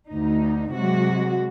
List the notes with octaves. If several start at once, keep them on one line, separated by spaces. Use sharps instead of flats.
D2 D#4
C3 F#3 G#3 F#4